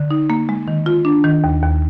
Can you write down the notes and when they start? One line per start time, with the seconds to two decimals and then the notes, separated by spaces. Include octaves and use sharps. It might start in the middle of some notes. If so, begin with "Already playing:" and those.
Already playing: D3
0.11 D#4
0.30 A#3
0.49 G#3
0.68 D#3
0.86 F4
1.05 D4
1.24 D#3
1.44 D#2
1.63 D#2